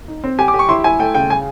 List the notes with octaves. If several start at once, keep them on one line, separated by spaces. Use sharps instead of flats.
D#4
C4
G4 G#5
D6
G4
C#6
E4 C6
E4 G#5
A3 G5
C#3 G5
G#4 G#5